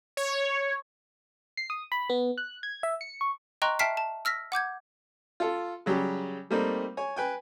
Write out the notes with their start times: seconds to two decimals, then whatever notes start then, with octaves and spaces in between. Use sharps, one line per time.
0.17 C#5
1.57 C7
1.70 D#6
1.92 B5
2.10 B3
2.38 F#6
2.63 G#6
2.83 E5
3.01 C#7
3.21 C#6
3.62 D#5 G5 A#5 C6 C#6 F#6
3.79 E5 G5 A5 F6 B6 C7
3.97 A5
4.25 E6 F6 A#6 B6
4.52 F#5 D6 G6 G#6
5.40 F4 A4
5.86 C#3 F#3 G3 G4
6.50 G3 A3 A#3 C4 D#4
6.97 C#5 G#5
7.16 B4 G5 G#5